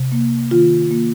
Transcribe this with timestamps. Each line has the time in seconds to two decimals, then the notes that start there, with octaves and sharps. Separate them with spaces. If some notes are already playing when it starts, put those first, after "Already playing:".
Already playing: C3
0.12 A#3
0.51 D#3 F4
0.91 A#3